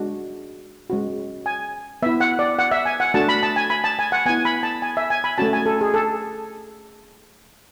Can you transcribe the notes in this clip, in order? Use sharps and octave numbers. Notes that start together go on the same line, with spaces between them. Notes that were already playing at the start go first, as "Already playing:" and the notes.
Already playing: G#3 D4 F#4
G#3 C#4 F#4
G#5
B3 E4 E5
F#5
D5
F#5
E5
G#5
F#5
A3 D4 F#4 A5
B5
A5
G#5
B5
A5
G#5
F#5
B3 E4 G#5
B5
A5
G#5
E5
G#5
B5
A3 C#4 F#4 A5
G#5
A4
G#4
A4